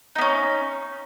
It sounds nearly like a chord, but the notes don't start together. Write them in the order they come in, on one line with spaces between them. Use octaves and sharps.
D#4 B3 C#4